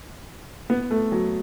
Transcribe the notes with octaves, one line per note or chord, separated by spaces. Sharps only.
B3
A3
F#3